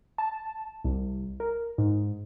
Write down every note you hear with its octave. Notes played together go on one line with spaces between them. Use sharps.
A5
C2
A#4
G#2